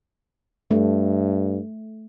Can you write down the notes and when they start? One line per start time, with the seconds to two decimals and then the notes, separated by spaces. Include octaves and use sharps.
0.71 G2 A3